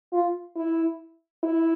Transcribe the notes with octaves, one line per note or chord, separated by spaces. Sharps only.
F4
E4
E4